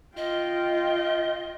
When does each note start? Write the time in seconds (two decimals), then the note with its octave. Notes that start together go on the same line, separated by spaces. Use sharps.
0.17 F4 D#5 G5